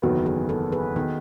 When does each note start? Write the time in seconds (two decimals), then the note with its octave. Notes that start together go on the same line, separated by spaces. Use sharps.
0.02 F#1 E2 D#3 F#3 B3 F#4 A4
0.26 G#4 B4
0.49 F#4 A4
0.72 G#4 B4
0.96 D#3 B3 D#4